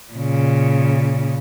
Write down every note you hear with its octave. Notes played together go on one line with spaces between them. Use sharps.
A#2 C#3